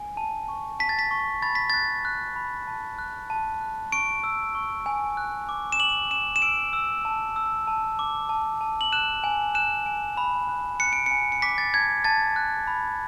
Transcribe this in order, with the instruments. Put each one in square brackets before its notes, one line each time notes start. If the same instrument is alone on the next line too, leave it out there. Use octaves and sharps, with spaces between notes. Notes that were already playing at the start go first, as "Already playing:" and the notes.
Already playing: [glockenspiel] G#5
A5
C#6
A5 B6
A6
B6
C#6
B5 A6
B6
F#6 A6
F#6
B5
A5
F#6
A5
F#6
C#6 D7
E6
C#6
G#5
F#6
D6
E7
D6 F#7
D6 E7
E7
E6 D7
E6
A5
E6
A5
D6
A5
A5
F#7
F#6 E7
G#5
F#6 E7
G#5
B5
F#6
F#6 C#7
D7
G#5 C#7
C#7
D6 B6
A6
A5 G#6
A5 A6
F#6
B5